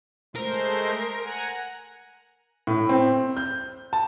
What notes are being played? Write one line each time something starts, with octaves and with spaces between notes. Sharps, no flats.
G#3 A3 A#4 C5
F#5 G#5 A#5
A2
C4
G6
A5